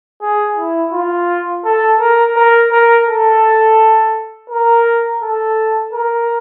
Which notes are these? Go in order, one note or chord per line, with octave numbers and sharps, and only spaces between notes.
G#4
E4
F4
A4
A#4
A#4
A#4
A4
A#4
A4
A#4